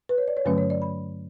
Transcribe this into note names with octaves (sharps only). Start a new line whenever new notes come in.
B4
C#5
D5
C#5
G2 D3 F#3 A3 C#4 B4
C#5
D5
B5